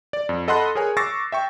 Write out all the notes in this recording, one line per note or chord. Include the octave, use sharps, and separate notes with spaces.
D5
F2
A4 D#5 F#5 B5 C6 F#6
G#4 A#4 C#5 G#5
C#6 D6 E6 A6 A#6 C7
E5 G5 C#6